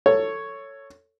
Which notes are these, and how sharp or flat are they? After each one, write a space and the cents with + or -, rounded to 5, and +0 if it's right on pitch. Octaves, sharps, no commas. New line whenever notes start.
A4 +15 C#5 +0